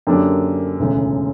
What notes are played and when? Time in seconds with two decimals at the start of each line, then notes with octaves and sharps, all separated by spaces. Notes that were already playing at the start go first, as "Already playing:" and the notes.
0.07 F#2 D3 A#3 D4 G4
0.79 E1 D2 C#3